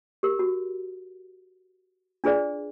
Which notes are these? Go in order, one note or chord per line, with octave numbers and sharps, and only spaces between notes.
G4 A#4
F#4
D4 F4 G#4 B4 D5